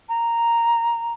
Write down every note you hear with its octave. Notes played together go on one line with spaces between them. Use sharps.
A#5